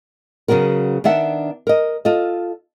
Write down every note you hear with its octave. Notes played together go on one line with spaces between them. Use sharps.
C#3 F#3 B3 F#4 A#4
D#3 B3 D4 E5 F#5
A#4 D#5
F4 A4 D#5